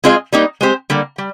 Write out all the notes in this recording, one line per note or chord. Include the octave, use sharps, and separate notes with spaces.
G#3 C4 F4 G#4 D#5
G3 A#3 D#4
G#3 C4 G4 C5
D3 G3 A#3
G3